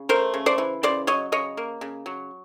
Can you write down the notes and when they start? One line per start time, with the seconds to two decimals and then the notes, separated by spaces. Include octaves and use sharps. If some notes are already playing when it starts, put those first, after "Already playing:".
Already playing: C#3
0.09 A3 A#4 C5
0.34 C#3
0.46 C5 D5
0.58 E3
0.83 C#3 C5 D5
1.07 F#3 C#5 D#5
1.32 C#3 C#5 D#5
1.57 A#3
1.81 C#3
2.06 F#3